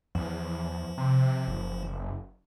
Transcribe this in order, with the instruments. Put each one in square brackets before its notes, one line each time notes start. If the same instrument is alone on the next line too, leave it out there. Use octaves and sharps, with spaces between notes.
[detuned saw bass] E2 [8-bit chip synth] F3
[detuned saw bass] C3
F#1